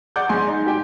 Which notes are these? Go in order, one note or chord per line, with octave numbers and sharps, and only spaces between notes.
D5 F#5 D6 G6
G#2 G#5 C6
D#4
G4 G5 G#5